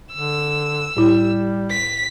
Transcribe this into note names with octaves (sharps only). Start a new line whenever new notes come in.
D3 E6
A2 G3 E4
B6